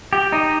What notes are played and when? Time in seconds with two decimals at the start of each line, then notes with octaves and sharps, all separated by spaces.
0.13 G4
0.32 D#4